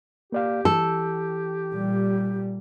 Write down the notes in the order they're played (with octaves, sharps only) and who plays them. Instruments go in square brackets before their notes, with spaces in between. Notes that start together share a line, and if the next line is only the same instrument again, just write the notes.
[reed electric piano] A#3 D5 F5 [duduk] G4
[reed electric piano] E3 [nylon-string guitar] A4
[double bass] A#2 G3